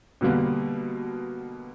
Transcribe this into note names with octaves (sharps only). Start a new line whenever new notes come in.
B2 D3 G3 A#3 B3